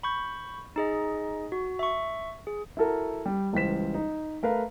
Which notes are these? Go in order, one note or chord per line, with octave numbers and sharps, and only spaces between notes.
B5 C#6 G6
D#4 G#4 D#5
F#4
E5 C#6
G#4
E4 F#4 A4 A#4
G3
C#2 E3 G3 C5 B6 E7
D#4
A3 A#4 B4 F5